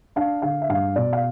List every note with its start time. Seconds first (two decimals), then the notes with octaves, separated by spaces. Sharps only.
0.16 D4 F5
0.42 D3 F5
0.62 E5
0.69 G2 F5
0.96 B2 D5
1.13 F5